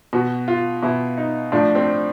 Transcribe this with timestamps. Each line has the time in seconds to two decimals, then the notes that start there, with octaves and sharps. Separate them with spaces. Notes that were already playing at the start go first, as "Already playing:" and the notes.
0.13 B2 F#4
0.48 F4
0.83 B2 E4
1.18 D#4
1.52 A2 F3 D4
1.75 C4